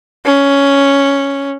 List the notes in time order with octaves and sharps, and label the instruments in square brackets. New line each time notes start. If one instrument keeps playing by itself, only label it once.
[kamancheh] C#4